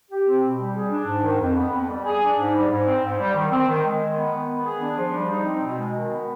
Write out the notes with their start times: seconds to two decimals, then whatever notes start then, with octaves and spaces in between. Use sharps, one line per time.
0.09 G4
0.24 C4
0.41 B2
0.58 G3
0.74 G#4
0.90 D4
1.06 G#2
1.23 D#3
1.39 F2
1.56 B3
1.71 F2
1.88 G3
2.05 G#4
2.21 D4
2.36 G#2
2.53 G3
2.69 G#2
2.85 C4
3.01 G#2
3.18 G3
3.35 D#3
3.50 C4
3.67 D#3
3.83 G#3
4.00 D#3
4.15 B3
4.33 D#3
4.49 B3
4.65 G#4
4.81 D4
4.97 F3
5.14 G3
5.30 D#4
5.46 C4
5.63 B2
5.78 G#3
5.94 D#3
6.11 B3